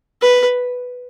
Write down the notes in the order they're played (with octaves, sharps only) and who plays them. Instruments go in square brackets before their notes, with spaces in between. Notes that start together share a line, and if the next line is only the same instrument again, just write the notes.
[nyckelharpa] B4